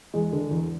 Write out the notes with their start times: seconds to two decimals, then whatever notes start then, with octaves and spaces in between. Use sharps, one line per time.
0.14 E2 G#3
0.32 D3
0.51 E2